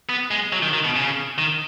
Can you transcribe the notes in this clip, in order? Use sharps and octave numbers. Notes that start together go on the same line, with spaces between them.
B3
G#3
F#3
D#3
D#3
B2
C#3
D#3